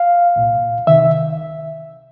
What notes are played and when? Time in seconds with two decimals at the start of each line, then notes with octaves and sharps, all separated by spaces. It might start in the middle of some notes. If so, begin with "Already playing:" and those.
Already playing: F5
0.36 C2 A#2
0.87 C2 C3 D#3 E5